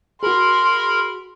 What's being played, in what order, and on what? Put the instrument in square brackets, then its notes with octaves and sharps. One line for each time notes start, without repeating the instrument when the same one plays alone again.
[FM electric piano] F#4 G#4 [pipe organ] A#4 B5 [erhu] C6